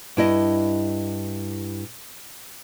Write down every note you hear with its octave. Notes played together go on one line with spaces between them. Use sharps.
G2 E4 D#5